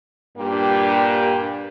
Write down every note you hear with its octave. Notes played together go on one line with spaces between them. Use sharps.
G2 A#2 G3 A#3 D4 G4